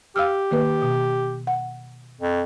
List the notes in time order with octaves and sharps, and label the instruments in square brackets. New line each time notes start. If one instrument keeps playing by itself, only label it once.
[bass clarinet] G4 [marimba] F5 E6 F6
[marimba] D#3 A#3 B4
B2
F#5
[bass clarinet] F2